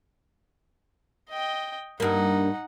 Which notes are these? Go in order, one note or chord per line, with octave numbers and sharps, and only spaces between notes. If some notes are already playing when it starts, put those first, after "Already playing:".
D#5 G5
G2 A#3 D#4 F#5